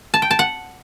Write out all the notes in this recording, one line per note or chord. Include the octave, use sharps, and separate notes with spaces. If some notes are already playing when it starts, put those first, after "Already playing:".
A5
G5
A5
F#5